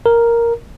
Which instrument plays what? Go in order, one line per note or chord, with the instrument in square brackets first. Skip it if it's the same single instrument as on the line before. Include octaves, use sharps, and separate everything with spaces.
[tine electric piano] A#4